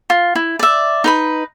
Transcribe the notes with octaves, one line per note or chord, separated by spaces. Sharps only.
F4
E4
D5 E5
D#4 B4 B5